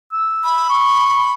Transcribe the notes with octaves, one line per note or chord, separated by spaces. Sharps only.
E6
B5
C#6